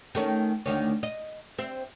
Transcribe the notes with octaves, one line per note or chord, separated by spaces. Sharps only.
D#3 A3 C#4
D2 D#3 C#4
D#5
C4 E5